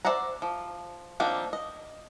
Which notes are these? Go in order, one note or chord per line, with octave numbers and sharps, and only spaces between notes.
C5 D5 E5 F#5 A#5
F3
D#3 F3 A#3 C4 D4
D#5